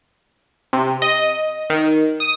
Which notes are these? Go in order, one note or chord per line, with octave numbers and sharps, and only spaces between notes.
C3
D#5
D#3
D#6